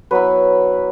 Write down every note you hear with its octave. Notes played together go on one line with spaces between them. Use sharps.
F#3 B3 E4 B4